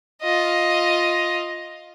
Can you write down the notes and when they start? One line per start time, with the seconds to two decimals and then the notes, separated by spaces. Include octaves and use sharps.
0.22 F4 D#5